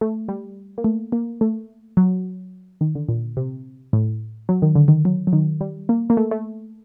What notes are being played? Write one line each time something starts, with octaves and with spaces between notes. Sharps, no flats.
A3
G3
A#3
A3
A#3
A3
F#3
D#3
D3
A#2
C3
A2
F#3
D#3
D3
D#3
F#3
F#3
D#3
G3
A#3
A#3
A3
A3